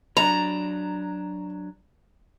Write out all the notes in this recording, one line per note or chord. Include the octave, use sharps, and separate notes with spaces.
F#3 D4 A#5